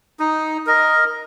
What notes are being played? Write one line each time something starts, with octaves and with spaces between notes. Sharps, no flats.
D#4
A#4 D#5